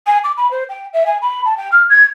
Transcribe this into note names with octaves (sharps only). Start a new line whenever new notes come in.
G#5
D6
B5
C5
G5
E5
G#5
B5
A5
G5
F6
G#6